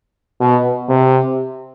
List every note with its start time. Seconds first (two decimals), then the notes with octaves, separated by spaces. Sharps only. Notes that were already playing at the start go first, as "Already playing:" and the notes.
0.41 B2
0.89 C3